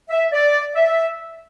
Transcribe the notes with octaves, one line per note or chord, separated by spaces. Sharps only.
E5
D5
E5